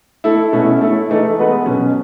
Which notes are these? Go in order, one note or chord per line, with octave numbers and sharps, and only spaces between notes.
A3 E4 A4
B2 A3 C#4 E4
A3 E4 A4
E3 A3 D#4 A4
G#3 B3 F#4 B4
B2 F#3 C#4